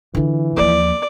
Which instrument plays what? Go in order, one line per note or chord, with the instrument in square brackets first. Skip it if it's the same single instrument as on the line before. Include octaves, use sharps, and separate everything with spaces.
[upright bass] D3 F4 [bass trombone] E3
[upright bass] D#2 F3 [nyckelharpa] D5